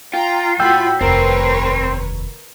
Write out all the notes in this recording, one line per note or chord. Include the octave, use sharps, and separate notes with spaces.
F4 G5 A#5
A2 F#4 G5 B5 E6 G6
F1 D#2 C4 A#4 B4 C#5